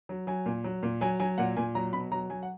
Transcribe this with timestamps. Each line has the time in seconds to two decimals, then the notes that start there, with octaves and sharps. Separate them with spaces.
0.09 F#3
0.27 F#3 G#5
0.46 A#2
0.64 F#3
0.83 A#2
1.01 F#3 G#5
1.20 F#3 G#5
1.38 A#2 F#5
1.57 A#2 G#5
1.75 F#3 A#5
1.93 B2 B5
2.12 F#3 A#5
2.30 F#3 G#5
2.43 F#5